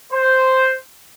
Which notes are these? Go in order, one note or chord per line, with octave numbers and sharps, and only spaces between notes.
C5